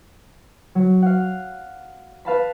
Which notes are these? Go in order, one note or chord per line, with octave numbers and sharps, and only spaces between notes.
F#3
F5 F#5
B4 F5 A5 B5